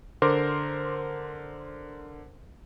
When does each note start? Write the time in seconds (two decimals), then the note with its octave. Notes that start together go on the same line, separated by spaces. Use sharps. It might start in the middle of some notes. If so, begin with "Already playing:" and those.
0.22 D3 A#4 C5 C6 D6